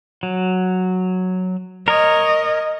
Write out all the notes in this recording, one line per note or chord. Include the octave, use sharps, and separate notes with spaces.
F#3
A#4 C#5 D#5